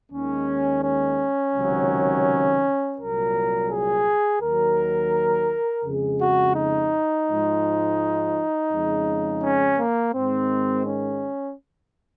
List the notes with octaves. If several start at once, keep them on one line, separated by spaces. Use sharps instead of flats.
D#2 D#3 G#3 C#4
C#4
C#2 C3 D#3 F#3
C2 A#2 F#3 A#4
G#4
D#2 D#3 F#3 A#4
F2 C#3 G#3 G#4
F#4
D#4
G#2 F3 G#3
F2 C#3 G#3
C#4
A#3
G#2 D#3 G#3 C4
C#4